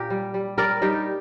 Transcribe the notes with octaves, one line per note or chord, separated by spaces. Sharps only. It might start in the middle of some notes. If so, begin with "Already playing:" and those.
Already playing: A#2 G4 A#4
G3
G3
G3 A#4 D5
G3 D#4 G4